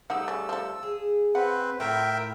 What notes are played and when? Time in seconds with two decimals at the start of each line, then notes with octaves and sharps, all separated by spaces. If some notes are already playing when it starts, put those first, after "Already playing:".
0.10 G3 A3 D#4 F#5 E6
0.28 C#3
0.49 F3 A4
0.83 G#4
1.35 C4 B4 F#5
1.80 A2 F4 A#4 E5 G5